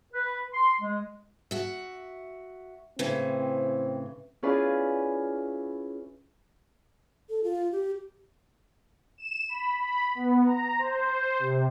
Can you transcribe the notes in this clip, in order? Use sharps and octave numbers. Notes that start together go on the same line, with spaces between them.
B4
C6
G#3
F#4 E5
A2 C#3 E3 C4
C#4 E4 F4 G#4 B4 D5
A4
F4
G4
E7
B5
B5
B3
A#5
C5
C3